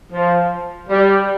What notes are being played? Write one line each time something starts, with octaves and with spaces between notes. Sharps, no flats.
F3
G3